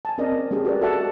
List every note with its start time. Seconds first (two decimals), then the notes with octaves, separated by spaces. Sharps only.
0.05 G#5 A5
0.18 C4 C#4 A#4 D5 D#5
0.51 G#3 C#4 G4 G#4
0.65 F#4 G4 A#4 B4 D5
0.81 F#4 A4 D5 E5 F#5 A5